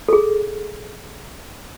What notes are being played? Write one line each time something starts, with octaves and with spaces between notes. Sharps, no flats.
G#4 A4